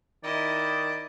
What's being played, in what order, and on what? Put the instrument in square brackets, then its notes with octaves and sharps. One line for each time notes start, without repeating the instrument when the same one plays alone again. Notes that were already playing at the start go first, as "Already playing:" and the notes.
[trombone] D#3 [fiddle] E4 D#5 [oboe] D5